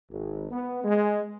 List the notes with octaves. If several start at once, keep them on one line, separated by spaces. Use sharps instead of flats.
G#1
B3
G#3